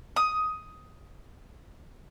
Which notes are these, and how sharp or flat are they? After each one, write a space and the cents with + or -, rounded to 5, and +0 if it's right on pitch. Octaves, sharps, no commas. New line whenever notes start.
D#6 +10